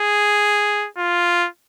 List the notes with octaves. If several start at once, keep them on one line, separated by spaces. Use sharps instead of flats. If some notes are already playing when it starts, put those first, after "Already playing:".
Already playing: G#4
F4